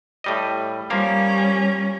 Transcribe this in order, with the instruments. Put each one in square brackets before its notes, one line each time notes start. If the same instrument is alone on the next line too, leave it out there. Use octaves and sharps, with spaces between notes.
[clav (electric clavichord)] A2 G3 D#5
[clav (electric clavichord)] F3 A#3 F5 [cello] G3 C#4